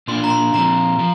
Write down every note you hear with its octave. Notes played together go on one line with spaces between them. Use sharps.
A#2 A#3 D4 F4 C6
A#5
C6
A#2 F3 C4 A#5
F3